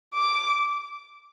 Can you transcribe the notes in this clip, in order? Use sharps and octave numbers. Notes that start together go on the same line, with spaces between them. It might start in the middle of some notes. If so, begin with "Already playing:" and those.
D6